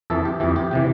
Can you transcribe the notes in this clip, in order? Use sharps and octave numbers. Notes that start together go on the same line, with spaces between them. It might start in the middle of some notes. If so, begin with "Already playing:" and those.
F2 E3 A4
G4
F2 E3 G4
G4
C3 E3 G4